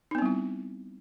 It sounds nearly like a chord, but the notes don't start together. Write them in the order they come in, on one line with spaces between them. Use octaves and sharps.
D#4 B3 C4 G3 E4